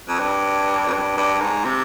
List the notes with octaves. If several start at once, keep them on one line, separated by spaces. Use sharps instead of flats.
F2
G2
F2
G2
G2
G#2
C3